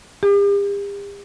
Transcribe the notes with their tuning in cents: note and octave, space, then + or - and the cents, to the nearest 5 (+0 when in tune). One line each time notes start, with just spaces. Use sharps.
G4 +45